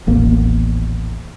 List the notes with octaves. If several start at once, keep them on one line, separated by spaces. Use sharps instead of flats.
D#1 A1 A#3 B3